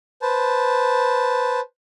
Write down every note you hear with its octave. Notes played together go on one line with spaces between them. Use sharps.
B4 C5 A5